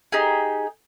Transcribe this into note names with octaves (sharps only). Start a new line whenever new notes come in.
D#4 G4 G#4